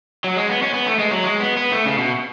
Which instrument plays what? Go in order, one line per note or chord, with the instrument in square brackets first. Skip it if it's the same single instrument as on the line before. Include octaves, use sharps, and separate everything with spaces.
[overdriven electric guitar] F#3
G#3
B3
C#4
B3
A3
G#3
F#3
G#3
B3
B3
A3
C#3
B2